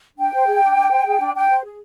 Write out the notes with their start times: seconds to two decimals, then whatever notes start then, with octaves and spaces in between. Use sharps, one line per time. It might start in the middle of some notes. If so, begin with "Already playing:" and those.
0.18 D4 G5
0.33 C5
0.47 G#4
0.62 D4
0.76 D4
0.91 C5
1.05 G#4
1.20 D4
1.35 D4 G5
1.49 C5
1.64 G#4